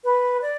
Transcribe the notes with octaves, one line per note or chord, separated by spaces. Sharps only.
B4
D5